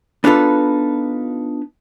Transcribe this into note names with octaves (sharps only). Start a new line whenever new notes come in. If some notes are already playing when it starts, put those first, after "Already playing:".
B3 D4 D#4 F4 A4 B4